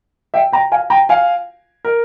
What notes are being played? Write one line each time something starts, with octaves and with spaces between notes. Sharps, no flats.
E5 G5
G5 A#5
F5 G#5
G5 A#5
F5 G#5
A#4